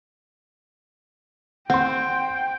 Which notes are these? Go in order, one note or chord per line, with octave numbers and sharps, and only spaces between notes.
C4 F#5 G5 C6 G6